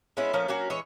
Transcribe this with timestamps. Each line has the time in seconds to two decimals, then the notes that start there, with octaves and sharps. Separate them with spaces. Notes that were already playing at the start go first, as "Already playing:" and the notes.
0.17 G#3 B3 C#4 E4
0.33 F3 A3 A#3 C#4
0.48 F#3 A#3 C#4 F#4
0.70 E3 G#3 C#5